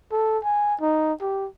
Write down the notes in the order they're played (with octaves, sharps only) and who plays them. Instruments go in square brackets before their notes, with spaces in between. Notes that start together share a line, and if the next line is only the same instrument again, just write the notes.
[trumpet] A4
G#5
D#4
G4